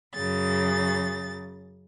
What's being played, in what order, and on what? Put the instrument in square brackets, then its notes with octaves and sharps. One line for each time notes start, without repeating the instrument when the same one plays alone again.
[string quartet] F#2 C#3 A6